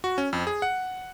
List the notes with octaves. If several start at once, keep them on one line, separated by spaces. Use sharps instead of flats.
F#4
C#4
F2
G#4
F#5